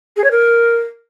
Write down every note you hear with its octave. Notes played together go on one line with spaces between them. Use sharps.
G#4
C#5
A#4